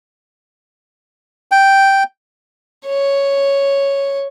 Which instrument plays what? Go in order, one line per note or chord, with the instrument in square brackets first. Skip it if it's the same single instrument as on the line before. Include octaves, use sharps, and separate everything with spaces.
[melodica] G5
[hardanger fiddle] C#5